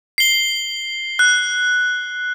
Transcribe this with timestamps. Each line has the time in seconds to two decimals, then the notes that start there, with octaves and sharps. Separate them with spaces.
0.18 C7 G7
1.19 F#6